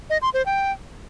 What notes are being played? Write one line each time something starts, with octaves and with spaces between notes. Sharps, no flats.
D#5
C6
C5
G5